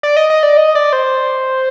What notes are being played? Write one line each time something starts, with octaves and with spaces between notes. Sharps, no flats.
D5
D#5
D#5
D5
D#5
D5
C5